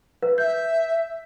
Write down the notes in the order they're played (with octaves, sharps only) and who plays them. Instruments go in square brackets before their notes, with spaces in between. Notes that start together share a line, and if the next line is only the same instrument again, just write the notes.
[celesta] B4
[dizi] E5 [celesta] G6